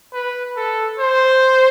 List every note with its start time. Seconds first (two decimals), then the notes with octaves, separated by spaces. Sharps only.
0.14 B4
0.56 A4
1.00 C5